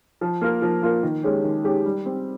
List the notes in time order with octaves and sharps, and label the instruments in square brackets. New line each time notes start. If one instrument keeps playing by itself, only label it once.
[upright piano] F3
A#3 F4 A#4
F3
A#3 F4 A#4
D#3
G#3 C#4 G4
D#3
G#3 C#4 G4
G3
C4 G4